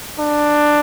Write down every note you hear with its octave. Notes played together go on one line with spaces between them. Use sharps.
D4